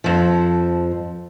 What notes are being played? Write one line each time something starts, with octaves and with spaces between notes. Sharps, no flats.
F2 F3